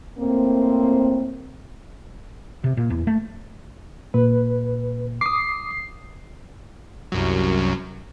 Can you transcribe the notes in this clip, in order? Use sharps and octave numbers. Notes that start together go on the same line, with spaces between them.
A2 A#3 C4
C3
A#2
E2
A3
A#2 B4
D6 D#6 C7
C2 F#2 F#3